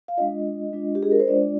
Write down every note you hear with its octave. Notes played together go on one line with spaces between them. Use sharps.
F5
G#3 D4 F4 D#5
G#3 D4 F4
G4
G#4
A#4
C5
G#3 D4 F4 D5